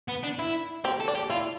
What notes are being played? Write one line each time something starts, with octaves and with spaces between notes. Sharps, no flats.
B3
D4
E4
C4 G4
A4
D4
G4
E4 F4